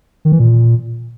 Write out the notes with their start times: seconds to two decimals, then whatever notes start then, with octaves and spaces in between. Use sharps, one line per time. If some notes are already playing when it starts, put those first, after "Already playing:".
0.25 D#3
0.32 E3
0.39 A#2